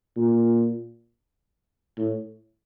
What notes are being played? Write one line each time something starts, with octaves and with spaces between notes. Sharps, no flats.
A#2
A2